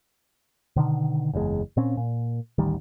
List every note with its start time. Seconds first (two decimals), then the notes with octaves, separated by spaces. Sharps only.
0.76 B2 D3 D#3
1.34 F#1 E2 A#2 G#3
1.77 A#2 C4 C#4
1.97 A#2
2.58 A1 D2 D#3 G3